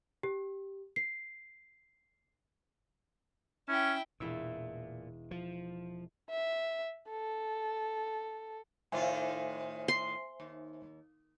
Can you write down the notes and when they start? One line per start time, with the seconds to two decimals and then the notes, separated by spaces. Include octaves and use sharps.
0.23 G4
0.96 C7
3.68 C#4 E4 G5
4.20 E1 A#2 E4 E6
5.31 F3
6.29 E5
7.10 A4
8.92 A2 D#3 F4 C5 E5 G#5
9.88 C6
10.40 D#2